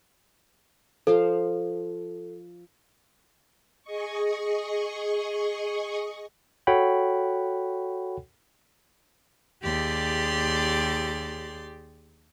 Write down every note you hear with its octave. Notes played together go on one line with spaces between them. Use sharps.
F3 A4 C5 F5
G#4 D#5 C#6
F#4 A4 C#5 F#5 G5 B5
D#2 G4 G#4 D5 C6